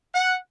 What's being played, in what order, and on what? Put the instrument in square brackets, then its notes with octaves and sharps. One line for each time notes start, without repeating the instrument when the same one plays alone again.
[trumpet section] F#5